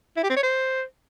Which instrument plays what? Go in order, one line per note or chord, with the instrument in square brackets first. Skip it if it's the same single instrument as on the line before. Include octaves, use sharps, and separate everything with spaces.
[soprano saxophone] E4
G4
C4
C#5
C5